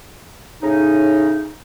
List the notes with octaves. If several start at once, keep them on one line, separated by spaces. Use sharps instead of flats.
A2 C#3 D#4